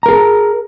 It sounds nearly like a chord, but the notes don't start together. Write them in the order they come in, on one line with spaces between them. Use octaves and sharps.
A#5 A#4 G#4